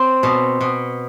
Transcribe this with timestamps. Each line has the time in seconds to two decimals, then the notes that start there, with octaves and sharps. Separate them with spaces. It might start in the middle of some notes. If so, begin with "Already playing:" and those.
Already playing: C4
0.23 B2
0.61 B2